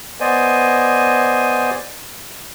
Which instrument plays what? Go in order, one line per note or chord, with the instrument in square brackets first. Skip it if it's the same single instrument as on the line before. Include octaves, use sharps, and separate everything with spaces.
[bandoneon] B3 C5 D5 D#5 G#5